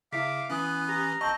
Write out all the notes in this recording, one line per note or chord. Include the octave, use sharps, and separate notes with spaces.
C#3 E4 E5 F5 D6 B6
E3 B3 C#4 E4 D#6 F#6
G4 A#5
G1 C4 D#5 A5 C#6 A#6